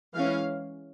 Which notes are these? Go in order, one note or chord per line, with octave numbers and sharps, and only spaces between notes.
E3 G#3 C#4 F5